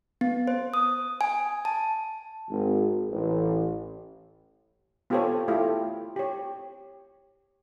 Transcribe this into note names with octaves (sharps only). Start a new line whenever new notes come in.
B3
C5
D#6
G#5
A5
G#1
A1
B3 F4 G4 A4 C5 C#5
A3 E4 F4 G4 A4
G4 C#5